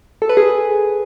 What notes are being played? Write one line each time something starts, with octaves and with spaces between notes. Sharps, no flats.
A4
B4
G#4